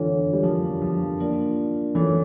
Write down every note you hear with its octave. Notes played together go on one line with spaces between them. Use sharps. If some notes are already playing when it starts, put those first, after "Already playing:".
Already playing: D3 E3 F4 A4 C#5
G3
F3 D4 F4 A#4
F3
A#3 D4 F4 A#4 D5
E3 C#4 F4 A4 C#5